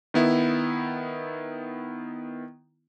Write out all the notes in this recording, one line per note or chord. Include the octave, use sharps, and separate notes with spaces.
D#3 B3 E4